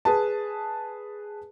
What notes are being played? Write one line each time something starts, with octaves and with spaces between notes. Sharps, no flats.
G#4 B4 A5